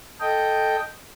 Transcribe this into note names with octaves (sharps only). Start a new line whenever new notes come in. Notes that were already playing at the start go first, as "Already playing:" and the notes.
A4 D#5 G5